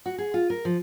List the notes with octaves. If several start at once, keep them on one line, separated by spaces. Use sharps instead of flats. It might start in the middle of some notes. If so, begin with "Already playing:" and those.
F#4
G#4
F4
A#4
F3